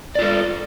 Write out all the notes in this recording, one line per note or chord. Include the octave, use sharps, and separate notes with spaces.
F4 A4 D5